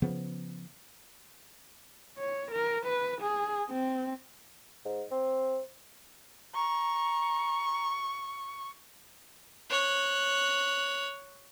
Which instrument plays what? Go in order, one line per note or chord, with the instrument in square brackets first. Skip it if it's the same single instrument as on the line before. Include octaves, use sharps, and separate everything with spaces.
[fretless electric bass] C#3 F3 B3
[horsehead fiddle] C#5
A#4
B4
G#4
C4
[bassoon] G#2
C4
[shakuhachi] A#5 [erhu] C#6
[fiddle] C#5 F#6